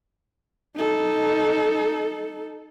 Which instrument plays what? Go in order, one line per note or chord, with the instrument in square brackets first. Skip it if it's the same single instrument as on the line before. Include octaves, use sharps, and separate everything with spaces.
[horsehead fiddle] D#4 A4